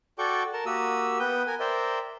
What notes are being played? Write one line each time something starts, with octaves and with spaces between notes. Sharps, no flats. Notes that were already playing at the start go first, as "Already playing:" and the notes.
F#4 A4 D5 G5 C#6 D6
A#4 A5
A#3 F#4 G4 D#6 E6
B3 B4 G5 D#6
A#4 G#5
A#4 C5 D5 E5 G5